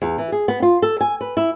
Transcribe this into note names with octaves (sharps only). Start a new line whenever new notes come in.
E2
E3
G#4
B3
F4
A4
G#5
B4
E4